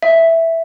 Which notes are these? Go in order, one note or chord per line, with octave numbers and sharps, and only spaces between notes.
E5